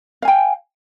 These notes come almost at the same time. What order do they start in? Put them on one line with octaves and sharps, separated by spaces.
F5 G#5 G5